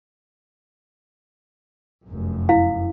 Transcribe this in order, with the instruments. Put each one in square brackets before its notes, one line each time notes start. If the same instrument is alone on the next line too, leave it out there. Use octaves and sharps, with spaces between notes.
[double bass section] F1 F#2
[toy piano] E4 F5